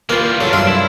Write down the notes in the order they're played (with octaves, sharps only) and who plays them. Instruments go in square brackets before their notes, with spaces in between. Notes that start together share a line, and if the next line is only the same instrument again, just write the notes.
[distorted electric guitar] E3 G3 [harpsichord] A#3 [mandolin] F4 B4
[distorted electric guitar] C3 D4 [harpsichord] F#3 [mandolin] A4
[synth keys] G2 F#3 E6 [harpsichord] F4 [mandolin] F5
[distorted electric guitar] E4